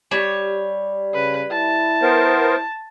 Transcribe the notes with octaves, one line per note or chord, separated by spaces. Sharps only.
G3 C#5
C#3 B4
E4 A5
B3 A#4 C5